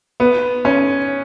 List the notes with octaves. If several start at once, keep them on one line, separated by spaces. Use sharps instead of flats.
B3
C#4